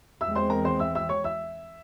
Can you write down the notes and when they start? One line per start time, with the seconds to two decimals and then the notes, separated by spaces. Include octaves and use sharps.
0.21 E2 E3 G#3 C4 E5 E6
0.35 C5 C6
0.50 A#4 A#5
0.65 C5 C6
0.79 E5 E6
0.95 E5 E6
1.09 C#5 C#6
1.24 E5 E6